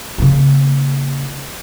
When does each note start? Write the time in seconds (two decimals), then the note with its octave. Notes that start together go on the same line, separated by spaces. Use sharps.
0.18 C#3 A#3